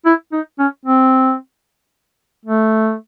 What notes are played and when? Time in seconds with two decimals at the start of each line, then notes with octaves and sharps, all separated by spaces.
0.05 E4
0.32 D#4
0.59 C#4
0.85 C4
2.45 A3